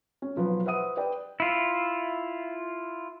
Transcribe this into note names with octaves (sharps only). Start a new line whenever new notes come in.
C#4
B1 F3 F#3 B4
B4 C5 E5 F#5 D#6 D#7
B4 D5 G5
E4 F4